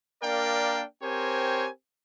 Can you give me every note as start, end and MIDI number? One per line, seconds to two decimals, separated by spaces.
0.23 0.83 58
0.23 0.83 62
0.23 0.83 70
0.23 0.83 74
0.23 0.83 77
0.23 0.83 79
1.03 1.69 60
1.03 1.69 67
1.03 1.69 70
1.03 1.69 72
1.03 1.69 73
1.03 1.69 80